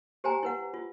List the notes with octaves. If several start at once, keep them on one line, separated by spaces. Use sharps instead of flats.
G4 C5 G5 G#5 A#5
E4 B4 F#5
F4